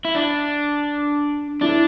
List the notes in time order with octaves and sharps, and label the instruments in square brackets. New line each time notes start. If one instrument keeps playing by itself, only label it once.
[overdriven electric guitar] E4
D4
[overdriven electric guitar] D4 [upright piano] E4